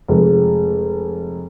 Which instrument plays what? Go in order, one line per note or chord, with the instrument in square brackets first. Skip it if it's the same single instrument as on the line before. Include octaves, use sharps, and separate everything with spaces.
[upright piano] F1 G#3